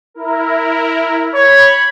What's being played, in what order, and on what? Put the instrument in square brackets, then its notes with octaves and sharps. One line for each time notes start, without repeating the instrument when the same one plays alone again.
[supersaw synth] E4 A#4
[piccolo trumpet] C#5 [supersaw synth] B5